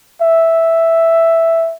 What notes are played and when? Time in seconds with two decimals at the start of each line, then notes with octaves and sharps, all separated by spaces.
0.21 E5